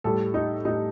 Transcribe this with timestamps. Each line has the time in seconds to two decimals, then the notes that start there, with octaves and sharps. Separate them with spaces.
0.04 A2 G3 A4
0.34 D#4
0.65 A2 G3 D#4